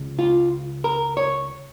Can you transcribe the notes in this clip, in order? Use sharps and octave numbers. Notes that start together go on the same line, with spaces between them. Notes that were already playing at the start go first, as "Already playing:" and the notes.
Already playing: C#2 C#3
F4
A#4
C#5